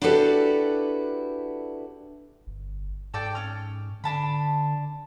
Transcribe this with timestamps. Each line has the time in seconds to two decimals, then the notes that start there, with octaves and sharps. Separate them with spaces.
0.02 D4 E4 F#4 G4 A4 B4
2.47 G1
3.14 G#2 A4 D5 G5
3.35 C#4 F6
4.04 D3 D4 A5 B5